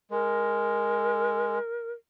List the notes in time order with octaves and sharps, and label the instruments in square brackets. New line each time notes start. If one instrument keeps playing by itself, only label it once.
[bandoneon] G#3 [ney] A#4